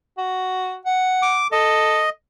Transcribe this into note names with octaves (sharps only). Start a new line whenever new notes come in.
F#4
F#5
D6
A4 D#5